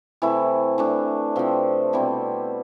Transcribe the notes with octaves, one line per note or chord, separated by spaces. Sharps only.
C3 E3 A3 E4
E3 A3 D4
C3 F3 C4
B2 G3 C4 E4